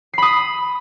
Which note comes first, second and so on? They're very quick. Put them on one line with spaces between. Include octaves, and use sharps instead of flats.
C7 B5 D#6